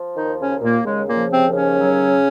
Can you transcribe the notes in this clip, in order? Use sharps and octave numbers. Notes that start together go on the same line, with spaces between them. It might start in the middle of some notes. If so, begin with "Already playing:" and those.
Already playing: F3
D#3 D#4
D#2
C#3 C#4
D#2
A#2 A#3
C#3 G#3
A#2 A#3
F3
C3 C4
D#2
C#3 C#4
F#3